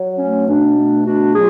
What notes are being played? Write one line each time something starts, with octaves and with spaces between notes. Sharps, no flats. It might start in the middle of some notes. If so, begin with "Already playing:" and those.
Already playing: F#3
A3 C#4
B2 D4
A3
B2 D4 F#4
F#3 F4 G#4